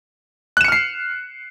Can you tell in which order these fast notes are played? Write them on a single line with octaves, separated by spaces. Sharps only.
F#6 E7 C#7 F6 C7